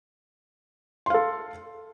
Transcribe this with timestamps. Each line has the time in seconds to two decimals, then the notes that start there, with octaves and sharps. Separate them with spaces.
1.06 C6
1.10 F5
1.14 A4